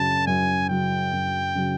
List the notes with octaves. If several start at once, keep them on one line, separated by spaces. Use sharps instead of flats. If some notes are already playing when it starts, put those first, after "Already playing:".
Already playing: F#2 C#3 F#3 A5
F#2 G#5
C#3 F#3 G5
F#2
C#3 F#3